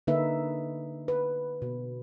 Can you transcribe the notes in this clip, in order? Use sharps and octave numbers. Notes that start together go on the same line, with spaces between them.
D3 A#3 D#4 B4 E5
B4
B2